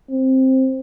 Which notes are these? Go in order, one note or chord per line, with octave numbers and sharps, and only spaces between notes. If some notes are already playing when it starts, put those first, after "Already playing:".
C4